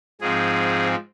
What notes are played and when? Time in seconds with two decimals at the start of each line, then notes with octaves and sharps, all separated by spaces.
0.21 G#2 F3 C4 G#4